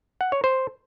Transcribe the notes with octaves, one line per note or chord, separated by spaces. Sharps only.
F#5
C#5
C5